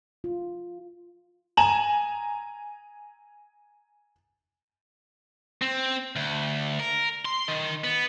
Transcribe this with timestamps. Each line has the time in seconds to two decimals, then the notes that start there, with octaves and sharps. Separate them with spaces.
0.24 F4
1.57 G#5 A#5 E7 F#7
5.62 C4
6.16 D2
6.79 A#4
7.25 C6
7.48 D#3
7.84 B3